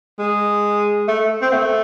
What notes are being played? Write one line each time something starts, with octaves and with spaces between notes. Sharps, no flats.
G#3
A3
C4
A3